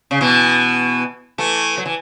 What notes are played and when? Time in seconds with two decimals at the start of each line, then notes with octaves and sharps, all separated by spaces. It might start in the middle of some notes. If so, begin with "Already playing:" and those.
0.11 C#3
0.21 B2 E3
1.38 E3 A3
1.77 F#3
1.86 E3